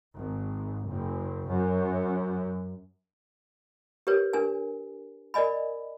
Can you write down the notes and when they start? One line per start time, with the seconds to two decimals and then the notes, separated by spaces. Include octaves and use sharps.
0.16 G#1
0.87 F#1
1.51 F#2
4.07 G4 A#4 B4 C#5
4.33 D4 A#4 G#5
5.34 A#4 D5 D#5 G#5 B5